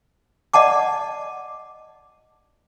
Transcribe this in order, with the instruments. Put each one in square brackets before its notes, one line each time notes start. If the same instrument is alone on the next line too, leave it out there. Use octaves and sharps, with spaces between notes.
[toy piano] D5 D#5 F#5 A5 D6